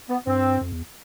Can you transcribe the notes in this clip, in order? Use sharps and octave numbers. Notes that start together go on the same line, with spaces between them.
B3
G2 C4
F2
E2